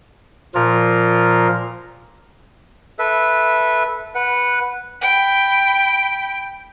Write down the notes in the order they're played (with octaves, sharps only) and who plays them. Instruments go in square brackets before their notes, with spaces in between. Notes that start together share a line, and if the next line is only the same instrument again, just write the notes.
[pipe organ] A#2 F3 F4 A#4
[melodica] A4 B4 E5
B4 F#5
[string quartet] G5 B5